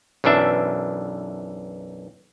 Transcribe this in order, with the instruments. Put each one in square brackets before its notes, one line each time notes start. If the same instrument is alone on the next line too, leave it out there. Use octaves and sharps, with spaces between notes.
[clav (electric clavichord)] B1 F#2 E3 D4 E5